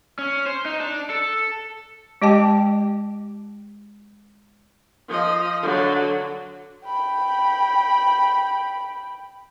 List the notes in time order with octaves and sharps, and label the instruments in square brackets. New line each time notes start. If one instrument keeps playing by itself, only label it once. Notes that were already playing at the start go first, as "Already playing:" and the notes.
[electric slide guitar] C#4
C5
D#4
D4
A4
[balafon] G#3 G4 D#5 G5 A5
[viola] F3 D#5
D3 F#3
[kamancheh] G5 B5